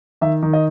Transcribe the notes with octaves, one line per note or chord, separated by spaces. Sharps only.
D#3 E5
D#3
D#5